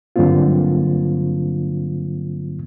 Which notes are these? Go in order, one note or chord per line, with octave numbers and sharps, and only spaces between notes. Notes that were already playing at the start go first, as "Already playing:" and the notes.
G2 D3 F#3 A#3 C4 F4